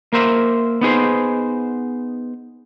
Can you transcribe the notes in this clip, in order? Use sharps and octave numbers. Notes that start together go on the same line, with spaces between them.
A#3 A#4 C5 E5
B3 D#4 G#4 C5